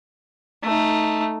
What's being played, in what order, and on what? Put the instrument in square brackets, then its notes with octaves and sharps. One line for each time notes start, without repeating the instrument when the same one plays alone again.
[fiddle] A3 D#4